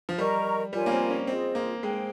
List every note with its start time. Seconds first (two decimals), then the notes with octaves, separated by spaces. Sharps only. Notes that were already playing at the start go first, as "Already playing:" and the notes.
0.09 F3
0.18 G3 A#4 D#5 A#5 C#6
0.73 G3 F4 A#4 C#5 G#5
0.86 A#3
0.91 C4
1.10 C#4
1.27 C4 F4 G#4 C5 D#5
1.55 A#3
1.83 G#3 G#4 C5 G5